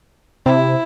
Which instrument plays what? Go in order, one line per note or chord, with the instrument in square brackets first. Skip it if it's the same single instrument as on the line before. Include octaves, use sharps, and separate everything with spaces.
[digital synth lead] C3 [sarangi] E4